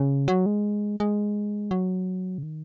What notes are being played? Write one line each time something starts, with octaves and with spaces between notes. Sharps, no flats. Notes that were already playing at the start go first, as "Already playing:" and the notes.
Already playing: C#3
F#3
G#3
G#3
F#3
C#3
D#3